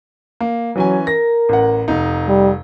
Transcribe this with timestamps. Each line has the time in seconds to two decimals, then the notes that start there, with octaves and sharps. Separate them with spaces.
0.40 A#3
0.76 E3 F#3 C#4 G#5
1.07 A#4 A#6
1.49 A1 F#5
1.88 F1 D#4
2.28 G3